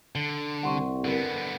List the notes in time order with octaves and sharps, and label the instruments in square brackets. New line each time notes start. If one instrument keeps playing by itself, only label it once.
[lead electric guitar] D3 [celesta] F#7 G7
[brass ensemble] C2 [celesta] F#5 C6 C#6
[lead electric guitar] D3 B3 [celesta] A#4 D5